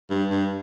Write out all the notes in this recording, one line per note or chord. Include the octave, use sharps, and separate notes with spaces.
G2
G2